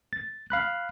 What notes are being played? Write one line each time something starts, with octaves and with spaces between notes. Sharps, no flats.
A6
F5 B5 F#6